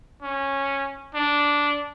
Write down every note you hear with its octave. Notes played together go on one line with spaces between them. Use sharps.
C#4
D4